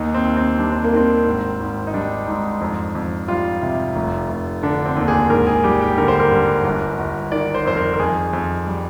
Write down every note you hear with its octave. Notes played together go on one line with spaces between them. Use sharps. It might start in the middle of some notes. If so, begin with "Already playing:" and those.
Already playing: D#2 D#4
C4
D#2
C4
G3 D4
C4
A#3
D#3 C4
G#1
G#1
D#4
G3 D4
G#2
F2
F2
G3 F4
C3
F1
F1
D3 D4
C4
D#2
G#4
G#1 A#4
G#4
G3 G4
G4
D3 A#4
C5
A#4
G2
G1
G1
D#3 D5
C5
F2 C5
A#4
A#4
F2 G#4
F2
G3